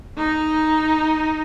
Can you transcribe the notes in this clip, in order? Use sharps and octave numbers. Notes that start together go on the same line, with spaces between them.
D#4